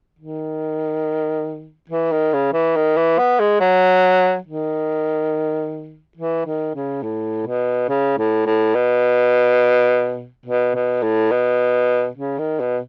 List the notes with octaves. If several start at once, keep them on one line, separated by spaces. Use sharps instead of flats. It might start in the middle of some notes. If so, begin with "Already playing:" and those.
D#3
E3
D#3
C#3
E3
D#3
E3
B3
G#3
F#3
D#3
E3
D#3
C#3
A2
B2
C#3
A2
A2
B2
B2
B2
A2
B2
C#3
D#3
B2